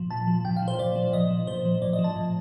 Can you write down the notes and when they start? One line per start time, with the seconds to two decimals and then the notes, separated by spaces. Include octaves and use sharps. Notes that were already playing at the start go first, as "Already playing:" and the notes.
Already playing: A#2 F3
0.11 A#2 A5
0.27 F3
0.45 A#2 G5
0.57 F5
0.62 F3
0.68 C5
0.79 A#2 D5
0.96 F3
1.13 A#2 D#5
1.31 F3
1.47 A#2 C5
1.65 F3
1.82 A2 D5
1.93 D#5
1.99 F3
2.04 A5
2.16 A2